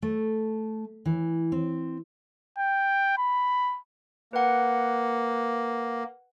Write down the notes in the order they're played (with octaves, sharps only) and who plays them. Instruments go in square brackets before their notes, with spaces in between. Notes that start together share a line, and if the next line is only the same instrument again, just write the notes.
[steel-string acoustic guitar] A3
E3
C4
[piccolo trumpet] G5
B5
[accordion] A#3 [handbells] B4 F#5